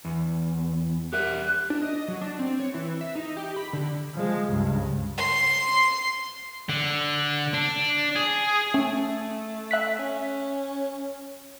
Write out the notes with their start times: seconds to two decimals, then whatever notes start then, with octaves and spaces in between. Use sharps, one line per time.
0.05 E2
1.13 G4 A#4 E5 F#6
1.70 D4
1.82 D#5
2.08 F#3
2.21 D4
2.39 C4
2.60 C#5
2.74 E3
3.01 E5
3.15 D#4
3.37 G4
3.56 B5
3.73 D3
4.14 F3 G#3
4.49 C#2 G2
5.18 C6
6.69 D3
7.54 D4
8.16 G#4
8.74 A3 C#4
9.71 E5 F#6 B6
9.99 C#4